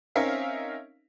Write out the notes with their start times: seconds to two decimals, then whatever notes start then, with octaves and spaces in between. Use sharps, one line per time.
0.16 C4 C#4 D#4 A#4 E5 F5